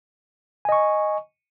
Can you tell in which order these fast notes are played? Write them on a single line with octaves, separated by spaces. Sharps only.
G#5 D#5 C#6